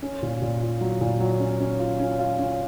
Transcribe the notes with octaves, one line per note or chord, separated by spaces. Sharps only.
C#4
A#2
A#2
F4
F#3
A#2
F#3
C#4
C#4
F4
C#4
F4
C#4